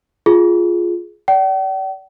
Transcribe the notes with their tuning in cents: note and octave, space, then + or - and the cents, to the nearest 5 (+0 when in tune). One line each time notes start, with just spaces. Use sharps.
F4 +0 G#4 +10
D5 -25 G5 -45